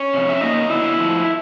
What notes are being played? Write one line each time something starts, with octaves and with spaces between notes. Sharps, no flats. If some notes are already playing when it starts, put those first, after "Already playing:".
Already playing: C#4 C#5
F2 C3
E5
A#2 F#3 A#3 D#4 D#5
D3 F#3 B3 E4 E5
A2 F3 A3